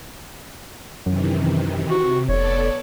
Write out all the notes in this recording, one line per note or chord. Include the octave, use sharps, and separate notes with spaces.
F#2 C3 D#3 E3
C3 F#4
F1 B3 A4 C#5 D5